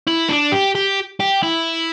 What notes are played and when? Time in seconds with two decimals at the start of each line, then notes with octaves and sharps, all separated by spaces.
0.08 E4
0.29 D4
0.52 G4
0.75 G4
1.20 G4
1.43 E4